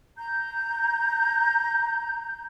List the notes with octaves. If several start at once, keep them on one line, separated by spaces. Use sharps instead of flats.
A#5 G6